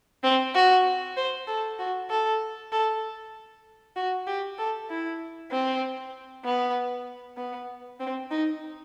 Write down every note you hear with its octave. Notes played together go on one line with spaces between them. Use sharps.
C4
F#4
C5
A4
F#4
A4
A4
F#4
G4
A4
E4
C4
B3
B3
C4
D#4